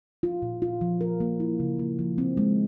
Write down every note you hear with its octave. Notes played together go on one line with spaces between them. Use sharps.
F4
A#2
F4
F3
A#4
A#3
E4
C#3
A#3
F3
C4
G#3